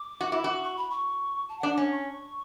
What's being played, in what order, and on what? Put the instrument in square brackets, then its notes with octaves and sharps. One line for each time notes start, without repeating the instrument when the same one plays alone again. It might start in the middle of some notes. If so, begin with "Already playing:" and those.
Already playing: [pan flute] D6
[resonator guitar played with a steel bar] F#4
E4
F#4
[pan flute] C#6
B5
C#6
A5
F#5
[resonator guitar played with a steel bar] D4
[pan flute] F#5
[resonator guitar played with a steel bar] C#4 [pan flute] G#5
[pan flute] C#6